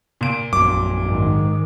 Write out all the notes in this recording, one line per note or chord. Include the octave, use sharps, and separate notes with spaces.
A#2 D7
A#1 F#2 D6
G#2 D#3 G#3